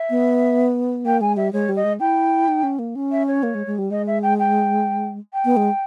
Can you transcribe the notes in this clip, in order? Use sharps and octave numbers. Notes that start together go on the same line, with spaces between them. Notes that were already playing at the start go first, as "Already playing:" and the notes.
Already playing: E5
B3
A#3 G5
G#3 G#5
G3 E5
G#3 C#5
G3
D#5
G#3
E4 G5
D#4
C#4
A#3
C#4
E5
C#5
A#3
G#3
G#3
G3
G#3 D#5
E5
G5
G5
G5
B3
G#3